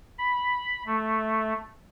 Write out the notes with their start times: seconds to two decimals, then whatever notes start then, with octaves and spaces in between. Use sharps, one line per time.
0.19 B5
0.87 A3